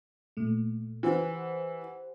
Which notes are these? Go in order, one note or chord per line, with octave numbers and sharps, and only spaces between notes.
A#2 A3
E3 G4 C5 F#5